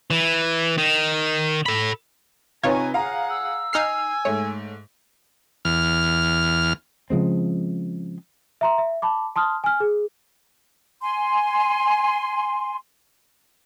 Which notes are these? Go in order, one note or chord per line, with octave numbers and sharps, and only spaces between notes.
E3
D#3
A4 B5
C3 D#4 F4 B4 C#5 G#5 A#5
G#4 F5 F#5 A#5
E6
D#4 G#5 F6 C7
G#2 A3 C#5
E2 F6
C#3 F3 G#3 C4
E5 A#5 C6
E5
A5 B5 D6
A5 C6 D#6 F6
G#5 F6
G#4
G#5 C6